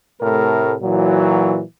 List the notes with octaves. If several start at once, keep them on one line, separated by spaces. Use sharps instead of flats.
A2 C3 A3 A#4
A#2 E3 F#3